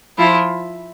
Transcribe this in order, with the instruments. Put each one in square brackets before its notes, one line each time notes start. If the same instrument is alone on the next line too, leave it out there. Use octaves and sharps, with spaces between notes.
[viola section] F3 F4 [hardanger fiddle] E4